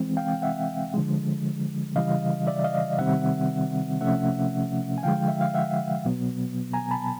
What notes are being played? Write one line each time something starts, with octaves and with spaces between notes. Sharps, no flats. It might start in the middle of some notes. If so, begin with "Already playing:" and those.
Already playing: E3 G#3 C4
F5 G5
E5 F#5
D3 F3 G#3
C#3 E3 G3 D#5 F5
D5 E5
D#5 F5
C3 D#3 G3 C4 E5 F#5
C3 F3 A3 C#4 E5 F#5
G#5
D3 F3 G#3 F5 G5
E5
F5
E5 F#5
B2 F#3 B3
G#5 A#5
A5 B5